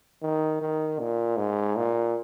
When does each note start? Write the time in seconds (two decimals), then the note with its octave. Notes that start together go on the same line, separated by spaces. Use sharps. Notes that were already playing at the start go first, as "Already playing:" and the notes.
0.22 D#3
0.61 D#3
1.00 A#2
1.37 G#2
1.76 A#2